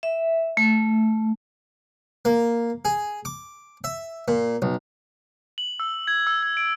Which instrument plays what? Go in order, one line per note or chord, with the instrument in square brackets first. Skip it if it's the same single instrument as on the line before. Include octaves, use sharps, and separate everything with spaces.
[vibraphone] E5
A3
[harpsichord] A#3
G#4
D6
E5
A#2
B1
[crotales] F#7
E6
G#6
E6
G#6
D7